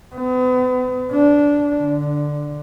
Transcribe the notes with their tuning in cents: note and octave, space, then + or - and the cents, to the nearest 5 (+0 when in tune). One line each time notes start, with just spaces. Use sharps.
B3 +40
D4 -15
D3 +5